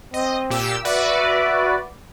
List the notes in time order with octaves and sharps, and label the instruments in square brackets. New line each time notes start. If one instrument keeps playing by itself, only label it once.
[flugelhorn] C4 [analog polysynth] D#5
[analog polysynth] A#2 G4 E6
[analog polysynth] F#4 B4 D5 [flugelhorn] E5